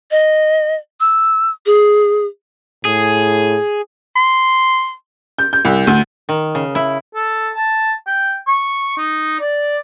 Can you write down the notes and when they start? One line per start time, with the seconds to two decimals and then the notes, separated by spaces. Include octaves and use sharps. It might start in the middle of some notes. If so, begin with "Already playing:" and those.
0.11 D#5
1.00 E6
1.66 G#4
2.85 A2 G#4
4.15 C6
5.39 G6
5.53 G6
5.65 C2
5.87 D2
6.29 D#3
6.55 C#3
6.75 E4
7.15 A4
7.55 A5
8.07 G5
8.48 C#6
8.97 D#4
9.40 D5